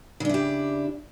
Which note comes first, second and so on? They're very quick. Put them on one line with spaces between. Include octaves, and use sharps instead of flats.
C#3 D4 E4 G4